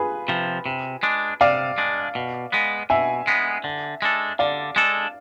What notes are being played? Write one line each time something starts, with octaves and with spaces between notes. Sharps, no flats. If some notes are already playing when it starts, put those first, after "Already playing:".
Already playing: F4 G#4 B4
C3 F3
C3
G#3 D4
C3 D5 F5
G#3 D4
B2
G#3 B3
B2 E5 G#5
G#3 B3
D3
G#3 D4 A4
D3 D5 F5
G#3 D4 A4